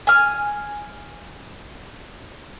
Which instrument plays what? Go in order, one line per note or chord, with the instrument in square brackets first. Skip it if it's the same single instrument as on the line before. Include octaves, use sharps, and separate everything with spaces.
[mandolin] G#5 F6